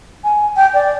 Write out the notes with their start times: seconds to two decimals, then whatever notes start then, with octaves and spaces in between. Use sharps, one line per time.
0.24 G#5
0.57 G5
0.74 D5